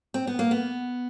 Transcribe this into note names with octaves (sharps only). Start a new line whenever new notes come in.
C4
B3
A#3
B3